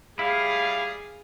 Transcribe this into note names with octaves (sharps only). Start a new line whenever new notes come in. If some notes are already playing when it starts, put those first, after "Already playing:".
G3 E4 G#4 F5